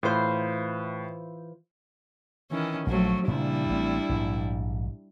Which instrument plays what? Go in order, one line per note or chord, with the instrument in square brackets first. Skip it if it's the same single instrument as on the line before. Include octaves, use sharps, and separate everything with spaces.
[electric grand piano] A2 [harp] E3 F4 C5
[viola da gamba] D#3 E3 C#4
[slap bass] A#1 [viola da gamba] F3 F#3 A3
[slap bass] A#2 C#3 F3 [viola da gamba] G3 D4 E4
[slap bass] A1 C4
A#1 G#2